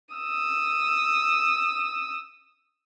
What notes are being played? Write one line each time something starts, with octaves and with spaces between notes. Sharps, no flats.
D#6 E6